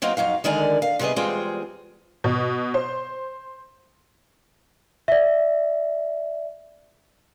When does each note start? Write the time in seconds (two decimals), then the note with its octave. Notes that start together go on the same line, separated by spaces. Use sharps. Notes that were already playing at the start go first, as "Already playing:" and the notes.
0.02 F#3 A#3 C4 D#4 F5
0.17 F2 F#3 D#4 F5
0.44 D3 D#3 G#3 A#4 D5 G#5
0.82 F5
0.99 C3 G3 B3 G#4 D#5
1.16 E2 G3 G#3 C4 F4 G#4
2.24 B2
2.74 C5
5.08 D5 E5